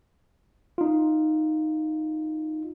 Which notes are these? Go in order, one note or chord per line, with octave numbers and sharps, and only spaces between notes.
D#4 F4